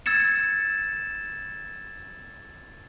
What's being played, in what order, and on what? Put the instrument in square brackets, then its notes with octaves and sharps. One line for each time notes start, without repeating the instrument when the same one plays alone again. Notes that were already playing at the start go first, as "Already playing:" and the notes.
[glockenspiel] E6 G#6 A6 C#7 E7